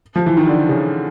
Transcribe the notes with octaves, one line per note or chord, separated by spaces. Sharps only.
F3
E3
D#3
D3
C#3